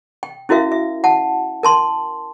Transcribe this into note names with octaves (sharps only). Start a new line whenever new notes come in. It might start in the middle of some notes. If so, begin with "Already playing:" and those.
G5
C#4 E4 F#4 A#4 E5 F5
E5
F#5 A5
A#4 A5 C6